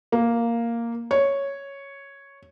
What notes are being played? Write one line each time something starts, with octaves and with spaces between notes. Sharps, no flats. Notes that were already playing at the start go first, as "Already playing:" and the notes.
A#3
C#5